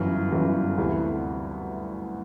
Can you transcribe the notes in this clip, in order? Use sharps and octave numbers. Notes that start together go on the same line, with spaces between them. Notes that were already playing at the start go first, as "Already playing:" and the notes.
Already playing: G1 F#2 E3
G1 F#2 E3
D2 C3 E3